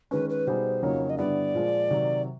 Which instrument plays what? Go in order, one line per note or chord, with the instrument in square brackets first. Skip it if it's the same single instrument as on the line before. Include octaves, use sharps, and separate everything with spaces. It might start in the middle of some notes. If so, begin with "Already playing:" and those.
[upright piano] D#3 G#3 C#4 [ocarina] B4
[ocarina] B4
[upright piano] B2 G3 B3 D#4 G#4 [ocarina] C5
[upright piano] F2 C#3 F#3 A#3 D#4 [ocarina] C#5
[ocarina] D#5
[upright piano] G2 D3 G3 B3 E4 [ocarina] D5
[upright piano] A#2 F3 G#3
C3 D#3 F#3